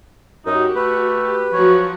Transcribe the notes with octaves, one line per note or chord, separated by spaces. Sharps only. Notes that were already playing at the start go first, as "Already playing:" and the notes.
F#2 D#4 F#4 G4
A3 B4
G4
F3 F#3 F#4 C#5